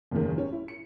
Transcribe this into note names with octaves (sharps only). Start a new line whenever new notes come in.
F#1 E2 A2 D#3
C#4
E4
C#7